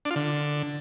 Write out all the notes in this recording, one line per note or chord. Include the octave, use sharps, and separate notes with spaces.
D4
F4
D3